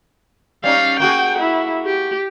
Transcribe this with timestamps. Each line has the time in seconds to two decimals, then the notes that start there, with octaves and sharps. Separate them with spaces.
0.64 G3 C#4 D#4 F5
1.00 A#3 F#4 G#4 G5
1.39 E4
1.86 G4